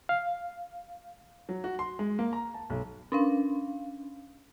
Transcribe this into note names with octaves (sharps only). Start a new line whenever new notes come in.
F5
F#3
F#4
C6
G#3
A#3
A#5
A5
B1
C#4 D4 F5